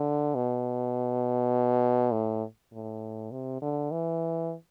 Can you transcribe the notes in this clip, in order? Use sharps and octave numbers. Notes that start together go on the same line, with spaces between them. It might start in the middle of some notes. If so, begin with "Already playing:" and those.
Already playing: D3
B2
A2
A2
C3
D3
E3